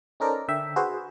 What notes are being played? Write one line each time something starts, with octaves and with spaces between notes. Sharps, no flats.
C#4 D#4 A4 A#4 C5 D5
D3 E5 G5
F#4 G#4 B4 C5